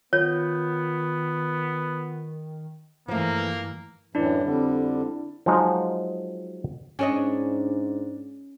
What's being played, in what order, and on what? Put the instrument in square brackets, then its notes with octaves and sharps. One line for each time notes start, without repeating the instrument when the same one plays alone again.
[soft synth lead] D#3 [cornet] B3 [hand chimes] F4 G6 [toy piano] C#5
[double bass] G2 E3 [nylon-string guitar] F3 A3 [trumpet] A#3
[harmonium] F#2 A2 E3 [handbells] D4 E4 D5
[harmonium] F2 D3 G3
[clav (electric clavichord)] F3 F#3 G#3 D#4
[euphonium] G#2 [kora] C#4 [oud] D4 C#5 D#5